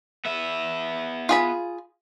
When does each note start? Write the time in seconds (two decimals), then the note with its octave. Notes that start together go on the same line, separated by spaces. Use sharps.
0.25 B3 E5
1.29 F4 G#4 B5